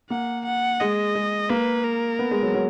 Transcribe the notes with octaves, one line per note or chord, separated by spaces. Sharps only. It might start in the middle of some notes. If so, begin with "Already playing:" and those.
A#3 F#5
F#5
G#3 D#5
G#3
A#3 B4
A#4
B3
G#3
F#3
F#3